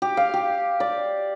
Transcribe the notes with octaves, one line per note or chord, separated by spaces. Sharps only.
G4
F5
G4
D5